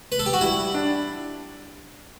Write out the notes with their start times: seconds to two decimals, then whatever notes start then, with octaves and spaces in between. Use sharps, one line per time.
0.12 B4
0.19 A4
0.26 G4
0.33 F#4
0.41 G3 E4
0.74 D4